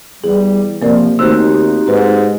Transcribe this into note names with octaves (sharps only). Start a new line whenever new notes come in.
E2 G3 G#4
C3 F3 A#3 A#4 D5
D#2 A3 C4 D#4 F#4 G4 C5 E6
G#2 B4